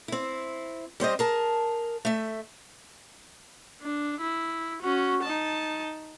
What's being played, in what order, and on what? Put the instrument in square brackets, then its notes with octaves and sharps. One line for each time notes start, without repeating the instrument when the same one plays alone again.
[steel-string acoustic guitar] C4 E4
G3 C4 C5 D#5
G#4 A#4 A5
A3 E5
[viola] D4
E4
C#4 F#4
D#4 A5